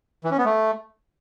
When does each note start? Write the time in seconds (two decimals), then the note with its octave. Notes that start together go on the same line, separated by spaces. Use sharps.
0.24 E3
0.31 C#4
0.38 B3
0.45 A3